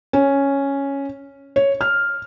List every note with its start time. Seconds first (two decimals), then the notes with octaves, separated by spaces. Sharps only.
0.13 C#4
1.56 C#5
1.81 F6